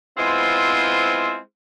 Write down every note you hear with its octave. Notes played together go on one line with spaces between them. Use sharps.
G#3 B3 C4 E4 F4 C5